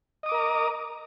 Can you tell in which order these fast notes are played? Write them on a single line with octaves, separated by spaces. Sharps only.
D#5 D#6 D6 A#4 A#5